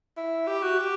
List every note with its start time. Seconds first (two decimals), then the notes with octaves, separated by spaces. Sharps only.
0.17 E4
0.47 G4
0.62 F#4
0.78 G4